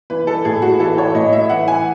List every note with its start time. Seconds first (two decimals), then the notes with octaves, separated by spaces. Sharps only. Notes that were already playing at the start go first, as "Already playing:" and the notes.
0.10 E3 B4
0.27 A4
0.45 A2 G#4
0.62 F#4
0.80 E3 A4
0.98 C#5
1.15 A2 D#5
1.33 E5
1.50 E3 F#5
1.68 G#5